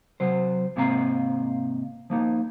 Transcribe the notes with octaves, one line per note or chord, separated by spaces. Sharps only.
C3 F#3 C5
G#2 C3 A#3 C4 F5 A#5
F3 A#3 D#4